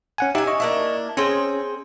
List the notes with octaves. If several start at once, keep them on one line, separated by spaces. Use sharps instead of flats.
C#4 F#5 G#5
D#4 E4 G4 G#5
D#5 C#6
A#3 D4 E4
C4 C#4 G#4 G5